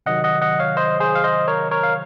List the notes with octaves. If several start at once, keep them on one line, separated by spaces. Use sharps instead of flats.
C3 D#3 F#3 D#5 F#5
D#5 F#5
D#5 F#5
C#5 F5
C5 D#5
G#4 C5
F5
C5 D#5
A#4 C#5
A#4 C#5
F5